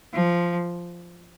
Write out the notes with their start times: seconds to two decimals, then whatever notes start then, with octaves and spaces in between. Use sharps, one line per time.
0.14 F3